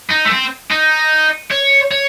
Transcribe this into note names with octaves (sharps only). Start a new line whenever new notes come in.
D#4
A3
C4
D#4
C#5
C#5